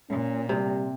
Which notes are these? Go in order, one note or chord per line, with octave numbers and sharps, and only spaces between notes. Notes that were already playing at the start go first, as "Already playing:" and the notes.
A#2 C#4
C3 G3